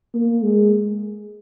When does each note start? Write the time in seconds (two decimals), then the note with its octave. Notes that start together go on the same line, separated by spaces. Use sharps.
0.14 A#3
0.43 G#3